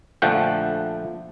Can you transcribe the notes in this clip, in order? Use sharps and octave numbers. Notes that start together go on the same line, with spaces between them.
A#1 D3 F3 A3 F#5 G5